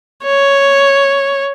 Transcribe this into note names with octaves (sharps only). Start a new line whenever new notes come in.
C#5